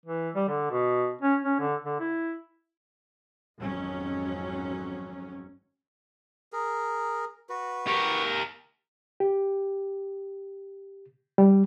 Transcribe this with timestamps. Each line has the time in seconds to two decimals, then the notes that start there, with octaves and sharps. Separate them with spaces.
0.05 E3
0.35 G3
0.48 D3
0.71 B2
1.21 C#4
1.44 C#4
1.60 D3
1.84 D3
2.00 E4
3.59 G#1 F2 F#3 C#4
6.53 G#4 A#4
7.49 F#4 B4
7.87 G4 A#4 C#6
9.20 G4
11.38 G3